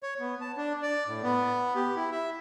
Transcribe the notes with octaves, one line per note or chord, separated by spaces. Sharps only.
C#5
B3
A5
D4
D5
A2
B3
G4
E4
E5